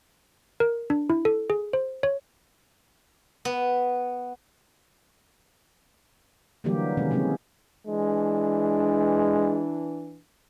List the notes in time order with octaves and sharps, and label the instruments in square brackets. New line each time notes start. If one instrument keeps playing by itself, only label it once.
[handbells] A#4
D4
E4
A4
G#4
C5
C#5
[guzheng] B3
[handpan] D3 E3 F#3 G3 A#3 G4
C3 D#3 G#3 C#4
C3 F#3 G#3 A#3 C#4
[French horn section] E3 D4 [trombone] G#3